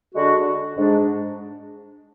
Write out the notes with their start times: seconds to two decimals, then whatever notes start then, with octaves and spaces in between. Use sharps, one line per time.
0.15 D3 G#3 D4 F#4
0.76 G#2 G#3 D4